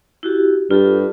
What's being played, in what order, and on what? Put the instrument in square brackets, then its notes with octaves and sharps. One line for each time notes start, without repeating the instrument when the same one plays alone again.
[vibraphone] E4 F#4 G4
[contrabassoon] G2 [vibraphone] F4 G4 A4